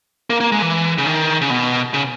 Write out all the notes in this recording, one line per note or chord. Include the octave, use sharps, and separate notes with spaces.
A#3
A#3
G#3
E3
C#3
D#3
C#3
B2
C#3